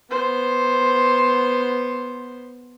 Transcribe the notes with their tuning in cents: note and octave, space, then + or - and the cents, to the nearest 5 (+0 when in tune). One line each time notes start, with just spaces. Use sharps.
B3 +0 C5 +5